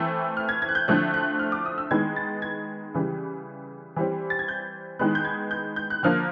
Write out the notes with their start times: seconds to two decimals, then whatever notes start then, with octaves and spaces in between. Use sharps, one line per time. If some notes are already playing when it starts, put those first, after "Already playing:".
Already playing: E3 A3 C4 E6
0.37 F6
0.49 G#6
0.62 G#6
0.69 F#6
0.75 G6
0.88 D3 F3 A3 C4 F#6
1.14 F#6
1.39 F6
1.52 D6
1.65 D#6
1.78 E6
1.91 D#3 G#3 B3 G#6
2.16 A6
2.42 G#6
2.94 C#3 E3 G3
3.96 E3 G3 C4
4.30 A6
4.39 G#6
4.48 G6
4.99 D#3 G#3 B3 F#6
5.15 G6
5.25 G#6
5.51 G6
5.76 G6
5.90 F#6
6.03 D3 F3 A#3 F6